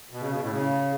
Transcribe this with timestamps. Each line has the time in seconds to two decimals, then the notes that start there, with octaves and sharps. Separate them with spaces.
0.11 B2
0.20 C#3
0.31 B2
0.41 A2
0.50 C#3